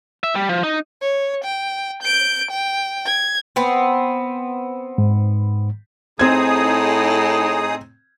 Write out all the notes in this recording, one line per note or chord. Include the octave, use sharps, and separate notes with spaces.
E5
G3
F3
D#4
C#5
G5
G6 D7
G5
G#6
B3 C4
G#2
A2 C4 D#4 G#4 D#6 G#6